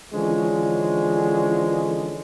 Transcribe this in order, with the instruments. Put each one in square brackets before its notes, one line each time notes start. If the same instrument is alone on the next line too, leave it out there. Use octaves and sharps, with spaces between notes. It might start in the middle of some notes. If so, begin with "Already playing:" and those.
[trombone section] D3 E3 F3 G#3 C#4 D4